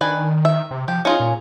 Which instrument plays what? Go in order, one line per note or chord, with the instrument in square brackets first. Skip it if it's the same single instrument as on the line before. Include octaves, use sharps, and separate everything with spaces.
[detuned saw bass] D#3 [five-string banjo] D4 B4 G#5
[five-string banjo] E5
[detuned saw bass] C3
[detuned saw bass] F3 [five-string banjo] G4
[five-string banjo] C#4 F4 G#4 [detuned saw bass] D#4
[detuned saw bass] A#2